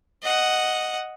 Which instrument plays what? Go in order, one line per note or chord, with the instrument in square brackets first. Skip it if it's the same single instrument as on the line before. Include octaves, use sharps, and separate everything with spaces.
[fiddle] D#5 F#5